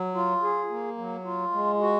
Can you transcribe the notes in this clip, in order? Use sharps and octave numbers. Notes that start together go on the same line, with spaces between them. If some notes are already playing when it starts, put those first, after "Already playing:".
Already playing: F#3
F4
G#4
A#3
F#3
F4
G#3
F#4